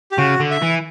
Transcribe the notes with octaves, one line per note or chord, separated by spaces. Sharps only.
G4
C#3 F#4
D3
E5
E3